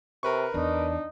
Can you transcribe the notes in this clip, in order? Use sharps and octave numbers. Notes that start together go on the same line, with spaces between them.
C3 A#4 B4 C#6
E2 D4 D#4